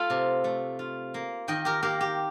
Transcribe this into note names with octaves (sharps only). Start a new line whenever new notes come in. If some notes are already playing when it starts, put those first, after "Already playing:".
Already playing: A3 F4 A4
C3
A3
F4
A#3
D#3 D#5 G5
G4 A#4
A#3 G4 A#4
G4